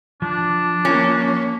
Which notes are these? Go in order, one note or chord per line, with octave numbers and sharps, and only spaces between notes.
F3 D4
A#3 C#4